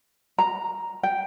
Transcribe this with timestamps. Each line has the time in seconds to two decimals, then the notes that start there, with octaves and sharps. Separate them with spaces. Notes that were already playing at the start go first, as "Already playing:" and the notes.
0.38 A#5
1.03 G5